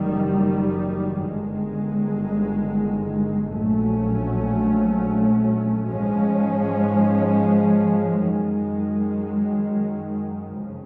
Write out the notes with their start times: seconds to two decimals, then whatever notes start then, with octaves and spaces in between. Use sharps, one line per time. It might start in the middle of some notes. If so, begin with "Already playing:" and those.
Already playing: F#1 F#2 D#3 G3
1.21 G1 G2 D#3 G#3
3.54 A#1 A#2 F#3 A3 C#4
5.87 G#2 F3 G#3 C#4
8.20 F#2 D#3 G#3
10.52 F#1 F2 C#3